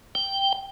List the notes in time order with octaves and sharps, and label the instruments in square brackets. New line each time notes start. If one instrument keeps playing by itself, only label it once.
[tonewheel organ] G5